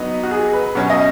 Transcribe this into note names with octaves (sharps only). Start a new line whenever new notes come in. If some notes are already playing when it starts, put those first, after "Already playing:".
Already playing: F#3 B3 D#4
F#4
G#4
B4
B2 F#3 C#4
D#5